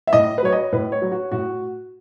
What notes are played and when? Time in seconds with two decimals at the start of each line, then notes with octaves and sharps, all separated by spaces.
0.07 E5
0.13 A2 D#5
0.38 B4
0.43 F#3 C#5
0.52 D#5
0.72 A2 B4
0.92 C#5
1.02 F#3
1.12 F#4
1.32 A2 F#4